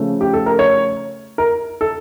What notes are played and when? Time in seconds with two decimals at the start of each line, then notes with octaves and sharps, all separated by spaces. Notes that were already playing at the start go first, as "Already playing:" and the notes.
Already playing: C#3 F3 A3 C#4
0.21 G4
0.33 A4
0.46 A#4
0.59 C#5
1.38 A#4
1.81 A4